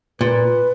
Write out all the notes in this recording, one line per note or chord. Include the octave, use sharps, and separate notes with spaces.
A#2 B4